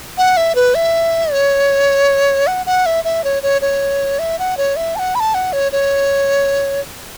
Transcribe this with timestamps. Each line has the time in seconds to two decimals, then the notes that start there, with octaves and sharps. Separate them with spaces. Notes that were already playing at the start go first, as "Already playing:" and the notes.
0.18 F#5
0.37 E5
0.55 B4
0.75 E5
1.32 C#5
2.47 F#5
2.66 F#5
2.86 E5
3.05 E5
3.24 C#5
3.43 C#5
3.62 C#5
4.19 E5
4.39 F#5
4.57 C#5
4.76 E5
4.96 A5
4.99 F#5
5.15 B5
5.20 A5
5.34 F#5
5.53 C#5
5.72 C#5